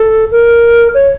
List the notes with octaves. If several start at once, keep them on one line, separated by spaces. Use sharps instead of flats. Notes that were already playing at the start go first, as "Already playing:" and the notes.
Already playing: A4
A#4
C#5